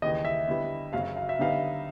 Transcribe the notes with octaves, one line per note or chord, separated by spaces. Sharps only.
D#2 C#3 E3 G3 D#5
E5
D3 G3 B3 E4
F#1 F#2 C#3 F#3 F5
F5
E5
D3 G3 B3 D#4 F5